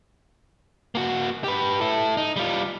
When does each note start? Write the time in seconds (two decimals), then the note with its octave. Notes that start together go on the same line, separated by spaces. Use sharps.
0.95 A#3 F#4
1.44 G4 B4
1.81 E4 A4
2.17 D#4
2.36 G3 F4